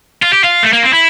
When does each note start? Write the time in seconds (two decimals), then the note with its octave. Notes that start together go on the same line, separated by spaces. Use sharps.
0.22 F4
0.33 G4
0.44 F4
0.63 A3
0.73 A#3
0.83 C4
0.93 E4